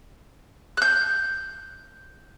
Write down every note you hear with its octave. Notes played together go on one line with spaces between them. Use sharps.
F#6 G6